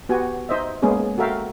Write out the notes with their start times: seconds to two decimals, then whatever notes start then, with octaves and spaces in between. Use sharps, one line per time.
0.09 B3 F#4 G4 G#5
0.49 D#4 C5 D#5 E5
0.82 G#3 A#3 B3 C#4 G#4
1.18 F#4 A4 A#4 E5 F5 G5